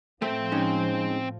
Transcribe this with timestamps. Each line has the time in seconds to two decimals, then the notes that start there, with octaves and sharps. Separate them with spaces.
0.22 A2 F3 A3 C4 C5
0.52 G#3 C#4 D#4